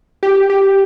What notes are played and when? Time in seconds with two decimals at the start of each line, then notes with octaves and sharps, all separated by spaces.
0.23 G4
0.50 G4